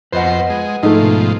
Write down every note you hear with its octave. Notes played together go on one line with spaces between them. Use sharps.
F2 B4 C5 D#5 F#5
G#3
G#2 F3 A3 D#4
B2